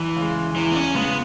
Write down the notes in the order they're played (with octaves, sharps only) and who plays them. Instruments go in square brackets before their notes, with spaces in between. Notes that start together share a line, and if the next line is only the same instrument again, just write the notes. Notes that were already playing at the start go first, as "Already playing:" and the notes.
Already playing: [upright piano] E2 [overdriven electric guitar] E3
[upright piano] C#3 G#3
[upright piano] E2 [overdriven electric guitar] E3
[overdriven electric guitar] B3
C#4
[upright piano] C#3 G#3 [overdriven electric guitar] B3